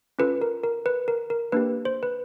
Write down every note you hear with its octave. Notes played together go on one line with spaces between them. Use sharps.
C#4 F4 A4 B4
A#4
A#4
B4
A#4
A#4
A#3 D4 G4 B4
C5
B4